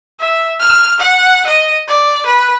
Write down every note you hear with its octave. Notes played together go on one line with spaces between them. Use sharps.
E5
F6
F#5
D#5
D5
B4